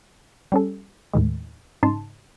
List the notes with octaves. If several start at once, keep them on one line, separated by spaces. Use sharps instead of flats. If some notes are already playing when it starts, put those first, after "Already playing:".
G3 C#4 A4
D#2 A2 D#3 G#3
G#2 C#3 D#4 A5 C6